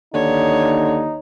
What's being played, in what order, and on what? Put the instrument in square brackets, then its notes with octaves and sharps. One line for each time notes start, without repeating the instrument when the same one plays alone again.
[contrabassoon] D#2 [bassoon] D3 [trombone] D#4 [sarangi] C#5